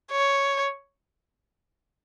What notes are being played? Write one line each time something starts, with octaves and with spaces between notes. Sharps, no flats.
C#5